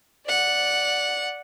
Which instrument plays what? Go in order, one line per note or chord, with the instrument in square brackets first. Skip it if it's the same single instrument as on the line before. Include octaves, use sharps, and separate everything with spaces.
[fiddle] D5 F#5